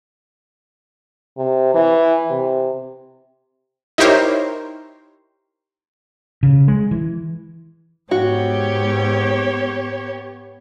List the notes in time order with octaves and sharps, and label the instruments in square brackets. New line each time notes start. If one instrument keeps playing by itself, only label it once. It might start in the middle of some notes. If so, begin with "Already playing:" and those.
[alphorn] C3
E3
C3
[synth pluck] D#4 E4 G4 A#4 C5 C#5
[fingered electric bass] C#3
G#3
E3
[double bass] G#2 [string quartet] B3 G4 C#5 [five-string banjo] F#4